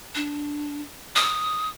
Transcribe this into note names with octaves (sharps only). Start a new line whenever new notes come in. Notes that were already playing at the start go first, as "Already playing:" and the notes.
D4
D#6